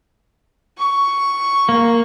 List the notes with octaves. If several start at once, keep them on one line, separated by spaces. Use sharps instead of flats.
C#6
A#3